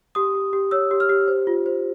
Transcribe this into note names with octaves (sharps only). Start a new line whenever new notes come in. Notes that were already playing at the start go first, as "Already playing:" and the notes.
G4 D#6
G4
G4
C#5 E6
G4
F6
G4
C5
F4
C5